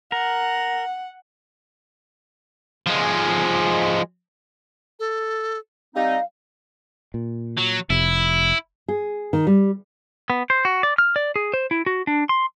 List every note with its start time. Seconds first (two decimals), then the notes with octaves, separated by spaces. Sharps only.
0.12 A#4 F#5
2.86 F3 G#3
5.00 A4
5.95 G3 C4 D#4 D#5 F5
7.14 A#2
7.58 F#3
7.90 F1 C3 E4
8.88 G#4
9.33 D#3
9.47 G3
10.30 B3
10.50 C5
10.65 F#4
10.83 D5
10.98 F6
11.16 D5
11.36 G#4
11.54 C5
11.71 E4
11.86 F#4
12.07 D4
12.29 C6